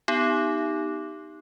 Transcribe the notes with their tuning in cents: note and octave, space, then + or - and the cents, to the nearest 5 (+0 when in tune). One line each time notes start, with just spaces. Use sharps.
B3 +10 D#4 +0 G4 +0